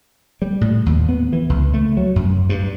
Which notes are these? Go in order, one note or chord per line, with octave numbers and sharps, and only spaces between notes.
G3
A2
D#2
B3
E3
C#2
A3
F#3
F#2
G2